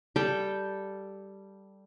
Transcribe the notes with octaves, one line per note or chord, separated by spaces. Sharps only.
G3 A4 G5